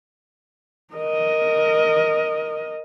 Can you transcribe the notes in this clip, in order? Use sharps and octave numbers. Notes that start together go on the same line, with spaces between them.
A#4 D#5